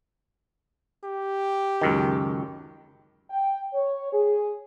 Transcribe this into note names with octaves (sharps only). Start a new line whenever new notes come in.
G4
C#2 F#2 D#3
G5
C#5
G#4